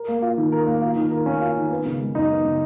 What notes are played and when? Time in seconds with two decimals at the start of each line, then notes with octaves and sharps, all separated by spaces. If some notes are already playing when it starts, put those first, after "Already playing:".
Already playing: A#4
0.08 A#3
0.22 F4
0.38 D#3
0.52 A#4
0.67 A#3
0.81 F4
0.96 D#3
1.11 A#4
1.26 A#3 C#4
1.41 F4
1.55 D#3
1.71 B3
1.85 C#3
2.00 G#3
2.15 F#2 D#4
2.30 B3
2.45 C#3